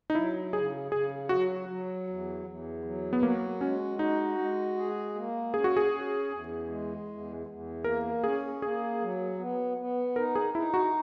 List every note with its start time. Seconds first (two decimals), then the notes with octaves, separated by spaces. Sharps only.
0.10 D#4
0.15 F#3 E4
0.53 C#3 G#4
0.92 C#3 G#4
1.29 F#3 F#4
1.69 F#3
2.07 E2
2.46 E2
2.84 F#3
3.13 B3
3.22 A#3 F#4
3.61 G#3 C#4
3.99 D#4 F#4
4.39 G#3
4.77 G#4
5.15 A#3
5.54 C#4 G#4
5.64 F#4
5.77 G#4
5.92 C#4
6.30 E2
6.69 G#3
7.08 E2
7.47 E2
7.84 A#3 A#4
8.24 C#4 G#4
8.62 A#3 G#4
9.01 F#3
9.38 B3
9.77 B3
10.16 D#4 A#4
10.35 G#4
10.54 D#4 E4
10.74 F#4